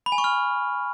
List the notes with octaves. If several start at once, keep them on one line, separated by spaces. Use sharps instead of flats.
B5
G#5
C#6
F6